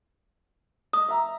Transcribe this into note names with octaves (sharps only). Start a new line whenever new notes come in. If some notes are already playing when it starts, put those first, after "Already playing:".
D#5 D#6
E5 A#5